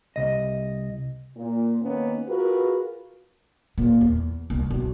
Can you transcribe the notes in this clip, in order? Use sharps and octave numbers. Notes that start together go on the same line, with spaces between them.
C2 D#5
A#2
D#3 A#3 B3 C#4
F4 F#4 G#4 A#4 B4
A#2
E2
C2
B1